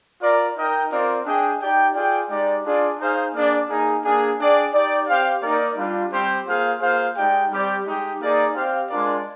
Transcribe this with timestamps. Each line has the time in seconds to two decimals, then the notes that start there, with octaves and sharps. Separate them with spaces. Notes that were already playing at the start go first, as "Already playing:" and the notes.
0.22 F4 A#4 D5
0.55 D#4 A#4 D#5 G5
0.91 C4 F4 A#4 D5
1.25 D4 G#4 D#5 G5
1.60 D#4 G4 D5 G5
1.95 F4 G#4 D5 G5
2.30 G#3 D#4 G4 D5
2.65 D4 F4 G#4 D5
2.98 D#4 G#4 C5 F5
3.33 A#3 D4 G#4 D5
3.68 A#3 D#4 G#4
4.03 A#3 D4 G#4
4.37 D4 G#4 D5 G5
4.73 D#4 G4 D5
5.08 C4 G4 C5 F5
5.42 A#3 D#4 A#4 D5
5.76 G3 D4 F4
6.12 G3 C4 G4 C5
6.46 A#3 F4 G#4 C5 F5
6.81 A#3 F4 G#4 C5 F5
7.16 G#3 D#4 G4 D5 G5
7.51 G3 C4 G4 D5
7.85 G#3 D#4 G4
8.20 A#3 D#4 G#4 D5
8.55 C4 G4 C5 F5
8.89 G#3 D4 F4 A#4 D5